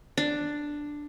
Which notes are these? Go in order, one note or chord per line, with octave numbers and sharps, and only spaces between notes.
D4